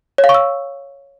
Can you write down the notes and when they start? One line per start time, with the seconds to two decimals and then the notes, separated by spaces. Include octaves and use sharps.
0.18 C#5
0.24 F5
0.29 C#6
0.34 E6